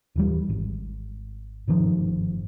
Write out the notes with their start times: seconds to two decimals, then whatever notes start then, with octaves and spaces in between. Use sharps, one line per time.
0.16 D#1 E3 G3
0.49 G#1
1.68 G1 G#2 D#3 F3